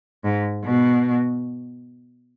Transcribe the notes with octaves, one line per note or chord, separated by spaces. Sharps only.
G#2
B2